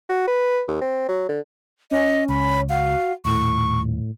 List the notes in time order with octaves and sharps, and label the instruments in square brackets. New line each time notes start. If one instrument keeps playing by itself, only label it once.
[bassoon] F#4
B4
D#2
C4
F#3
D3
[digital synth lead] C#4 [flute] D#5
[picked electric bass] C#2 [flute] B5
[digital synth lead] F#4 [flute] F5
[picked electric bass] D#1 [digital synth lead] A2 [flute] C#6